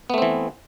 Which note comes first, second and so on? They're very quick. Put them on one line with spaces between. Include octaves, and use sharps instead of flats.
B3 A3 C4 E3